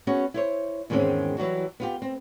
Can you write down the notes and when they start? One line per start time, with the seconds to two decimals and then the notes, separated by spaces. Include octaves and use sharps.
0.07 B3 C#4 F#4 G#4
0.34 E4 C5 C#5
0.90 E2 G#2 D#3 G#3 C4 C#4
1.37 E3 F#3 G3 F#4
1.80 B3 F4 G4
2.02 C4